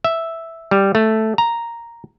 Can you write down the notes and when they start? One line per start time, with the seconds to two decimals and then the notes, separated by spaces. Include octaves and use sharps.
0.04 E5
0.71 G3
0.95 A3
1.38 A#5